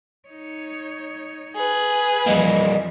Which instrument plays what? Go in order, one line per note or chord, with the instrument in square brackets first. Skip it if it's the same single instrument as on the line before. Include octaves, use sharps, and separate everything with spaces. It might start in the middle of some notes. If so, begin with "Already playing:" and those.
[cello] D#4 C#5
[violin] G#4 B4
[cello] F2 E3 [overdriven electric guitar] G3 A#3 [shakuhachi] D#5